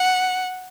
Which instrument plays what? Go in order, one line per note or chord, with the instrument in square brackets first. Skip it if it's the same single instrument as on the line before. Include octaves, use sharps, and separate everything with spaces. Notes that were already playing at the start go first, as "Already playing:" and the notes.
Already playing: [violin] F#5